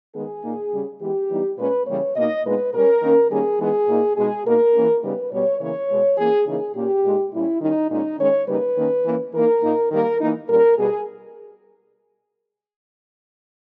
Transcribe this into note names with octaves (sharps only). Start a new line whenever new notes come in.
D#3 G#3 B3 G#4
A#2 A#3 D#4
C#3 G3 C#4
E3 G#3 B3 G4
E3 G3 B3 D#4
A#2 G#3 C#4 B4
C#3 E3 G3 A#3 C#5
B2 A#3 D#4 D#5
A#2 G#3 B3 D#4 B4
B2 G3 C#4 A#4
D#3 A#3 C#4
D#3 G3 A#3 C#4 G#4
E3 G#3 B3 D#4 G#4
A#2 A#3 D#4
B2 G#3 D#4 G#4
B2 A#3 D#4 A#4
E3 A#3 C#4
C#3 G3 B3 D#4 B4
B2 G3 B3 C#5
C#3 E3 A#3 C#5
B2 G#3 B3
E3 A#3 C#4 G#4
C#3 E3 A#3 D#4 G#4
A#2 A#3 C#4 G4
A#2 G#3 D#4
A#2 G3 C#4 E4
D#3 G3 C#4 D#4
A#2 G#3 C#4 D#4
D#3 G#3 C#4 C#5
C#3 G3 A#3 D#4 B4
D#3 A#3 C#4
E3 A#3 C#4
E3 A#3 D#4 A#4
A#2 A#3 D#4
D#3 G3 A#3 A#4
E3 A#3 D#4
A#2 G3 C#4 A#4
B2 G3 B3 G#4